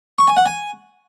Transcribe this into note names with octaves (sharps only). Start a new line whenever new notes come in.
C#6
G#5
F#5
G#5